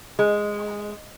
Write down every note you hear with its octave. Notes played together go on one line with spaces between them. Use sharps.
G#3